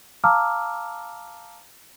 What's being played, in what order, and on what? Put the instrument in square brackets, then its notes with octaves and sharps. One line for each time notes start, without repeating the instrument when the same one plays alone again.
[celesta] F5 A5 A#5 D6 E6 F6